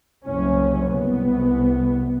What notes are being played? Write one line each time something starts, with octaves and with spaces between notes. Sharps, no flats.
F#1 C2 C#4
C2 B3